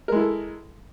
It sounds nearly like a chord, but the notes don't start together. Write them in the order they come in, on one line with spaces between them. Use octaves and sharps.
A#4 G#3 E4 A4